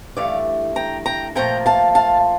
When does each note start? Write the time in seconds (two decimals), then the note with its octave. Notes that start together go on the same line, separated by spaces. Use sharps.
0.16 G2 E3 A3 D5 F5
0.76 G5 A#5
1.06 G5 A#5
1.35 A#2 F3 A3 G5 A#5
1.66 F5 A5
1.95 F5 A5